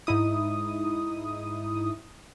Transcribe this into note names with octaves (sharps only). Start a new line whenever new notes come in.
G#2 D#4 E4 D#6